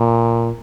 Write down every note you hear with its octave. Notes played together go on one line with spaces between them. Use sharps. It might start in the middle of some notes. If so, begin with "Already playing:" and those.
Already playing: A#2